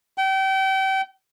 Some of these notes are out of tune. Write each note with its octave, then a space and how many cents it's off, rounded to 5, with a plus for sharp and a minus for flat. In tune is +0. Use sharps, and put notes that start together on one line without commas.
G5 -35